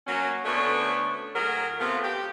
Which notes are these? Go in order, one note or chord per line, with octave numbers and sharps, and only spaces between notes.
F#3 A#3 C#4
D2 A3 B3 C#4 D4 C#5
A2 F#3 G#4 A#4
C3 A3 B3 F4
G4